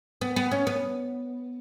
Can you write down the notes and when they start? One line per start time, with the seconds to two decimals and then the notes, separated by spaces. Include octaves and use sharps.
0.21 B3
0.36 B3
0.51 C#4
0.67 B3